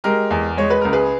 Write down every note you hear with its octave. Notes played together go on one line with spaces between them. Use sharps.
G#3 G4 A#4
E2
G#3 C#5
B4
C#2 A#4
G#4 B4